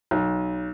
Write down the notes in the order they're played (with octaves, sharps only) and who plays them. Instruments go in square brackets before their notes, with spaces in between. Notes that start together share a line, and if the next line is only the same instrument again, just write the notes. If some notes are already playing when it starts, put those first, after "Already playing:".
[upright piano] B1